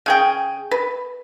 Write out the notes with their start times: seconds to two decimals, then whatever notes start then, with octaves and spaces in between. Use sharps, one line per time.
0.06 C#3 G#4 G5
0.71 B4